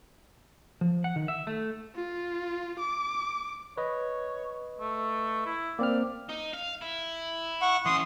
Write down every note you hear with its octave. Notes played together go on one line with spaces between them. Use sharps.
F3
F#5
D#3
E5
A3
F4
D6
B4 C#5 D#5
A3
E4
A#3 C4 D5 F6
D#4
F5
E4
F#5 C#6
E3 C#4 C6 D#6